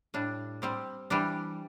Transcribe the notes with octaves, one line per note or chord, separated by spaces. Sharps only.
A2 G3 D4
G3 C4 G4
E3 G3 D4 G4